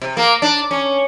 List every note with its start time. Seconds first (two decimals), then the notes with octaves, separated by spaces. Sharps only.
0.02 C3
0.17 A#3
0.42 D4
0.71 C#4